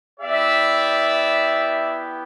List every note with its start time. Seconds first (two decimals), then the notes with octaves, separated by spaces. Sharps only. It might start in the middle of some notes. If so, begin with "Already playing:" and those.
0.20 B3 E4 G4 D5 E5